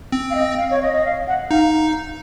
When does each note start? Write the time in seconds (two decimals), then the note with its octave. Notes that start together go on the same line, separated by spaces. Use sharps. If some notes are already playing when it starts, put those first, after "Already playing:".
0.12 C4
0.30 F5
0.35 D#5
0.58 F5
0.71 C#5
0.82 D#5
0.93 D#5
1.05 F5
1.27 F#5
1.51 D#4 F5